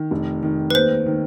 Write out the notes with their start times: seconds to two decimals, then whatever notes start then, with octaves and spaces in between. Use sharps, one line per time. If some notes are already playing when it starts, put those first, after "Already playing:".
Already playing: D#3
0.11 F1
0.43 D#3
0.70 B4
0.74 D#2 C5
1.06 D#3